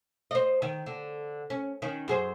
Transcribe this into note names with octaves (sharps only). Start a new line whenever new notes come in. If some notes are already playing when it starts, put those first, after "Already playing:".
C5 D#5
D#3
D3
C#4
D#3 C#4
F#2 G#4 C5